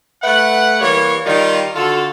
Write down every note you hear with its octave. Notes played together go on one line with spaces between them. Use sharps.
A3 B4 E5 F#5
E3 G3 A#3 C#5
D#3 G3 F4
D3 F4 F#4 A4